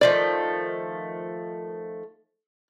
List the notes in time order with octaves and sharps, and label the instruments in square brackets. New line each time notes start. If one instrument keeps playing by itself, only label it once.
[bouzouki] D#3 F3 A3 [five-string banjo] D5